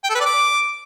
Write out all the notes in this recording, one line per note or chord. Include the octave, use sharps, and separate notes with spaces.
G5
A4
B4
D5
D6